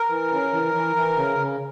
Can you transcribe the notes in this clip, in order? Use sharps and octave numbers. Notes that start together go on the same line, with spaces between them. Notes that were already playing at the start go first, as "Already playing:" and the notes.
Already playing: A#4
E3
C#3
E3
E3
E3
C#3
C#3